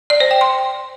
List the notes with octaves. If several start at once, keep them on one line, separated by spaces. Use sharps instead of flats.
D5
C5
G5
C6